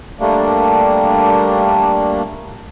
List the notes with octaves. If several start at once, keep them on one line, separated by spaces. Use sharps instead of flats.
G3 A3 A#3 D4